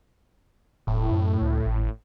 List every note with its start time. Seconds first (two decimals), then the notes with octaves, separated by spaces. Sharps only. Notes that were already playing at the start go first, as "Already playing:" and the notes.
0.87 E1 A2
1.11 F#2
1.41 C#2
1.66 G#1